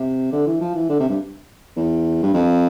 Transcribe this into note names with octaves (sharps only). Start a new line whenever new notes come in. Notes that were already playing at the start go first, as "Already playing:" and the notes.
Already playing: C3
D3
E3
F3
E3
D3
C3
G2
E2
G2
F2